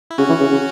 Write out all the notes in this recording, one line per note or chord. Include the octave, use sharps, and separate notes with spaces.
E4
C#3 C#4 F#4
E3
C#3
C#3